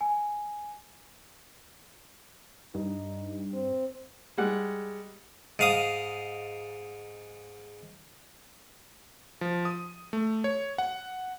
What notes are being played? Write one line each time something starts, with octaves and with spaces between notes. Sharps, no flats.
G#5
G2 D#4
C4
G3 G#3 F#5
G#2 F5 D#6
F3
D#6
A3
C#5
F#5